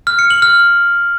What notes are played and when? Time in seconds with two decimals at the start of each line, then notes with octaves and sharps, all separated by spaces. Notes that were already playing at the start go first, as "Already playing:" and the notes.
0.07 F6
0.19 C#7
0.30 F#7
0.42 F6